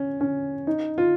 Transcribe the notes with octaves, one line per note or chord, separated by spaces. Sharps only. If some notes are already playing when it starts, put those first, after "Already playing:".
Already playing: C#4
C#4
D#4
F4